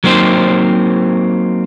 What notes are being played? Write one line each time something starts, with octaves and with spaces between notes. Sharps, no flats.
F#3 A#3 C4 D#4 C5